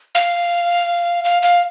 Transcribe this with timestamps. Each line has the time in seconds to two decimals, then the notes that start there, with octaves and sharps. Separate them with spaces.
0.15 F5
1.24 F5
1.42 F5